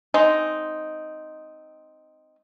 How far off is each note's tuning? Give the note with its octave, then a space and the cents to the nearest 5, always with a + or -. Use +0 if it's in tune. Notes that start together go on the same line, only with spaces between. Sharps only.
G#3 +0 C4 +0 D#4 +0